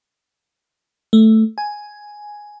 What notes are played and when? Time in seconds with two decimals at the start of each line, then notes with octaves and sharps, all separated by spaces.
1.13 A3
1.58 G#5